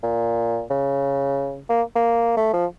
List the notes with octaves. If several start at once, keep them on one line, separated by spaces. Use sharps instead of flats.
A#2
C#3
A#3
A#3
A3
F3